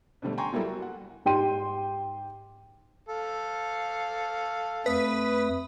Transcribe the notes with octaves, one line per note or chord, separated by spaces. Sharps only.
B2 D3 G3 A3
G5 G#5 A#5 C6 C#6
F#3 G3 A#3 E4 A4
F#4
F#5
G#2 G4 G5 C6 D#7
A4 F5
F2 A3 B4 D#6